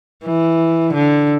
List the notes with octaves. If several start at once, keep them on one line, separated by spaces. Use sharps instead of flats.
E3
D3